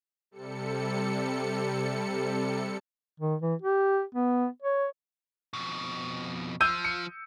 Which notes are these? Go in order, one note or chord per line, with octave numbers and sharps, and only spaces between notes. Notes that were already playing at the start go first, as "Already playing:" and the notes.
C3 G3 A4 C#7
D#3
E3
G4
B3
C#5
F2 B2
F3 E6 G6 D#7
C#7